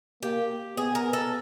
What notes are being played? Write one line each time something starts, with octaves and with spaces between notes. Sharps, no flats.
A#3 G4
B3 G#4
A#4
A4